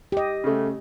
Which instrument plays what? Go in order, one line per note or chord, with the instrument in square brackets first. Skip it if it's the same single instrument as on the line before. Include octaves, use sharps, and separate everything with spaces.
[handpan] G4 D#5
[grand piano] C#3 A3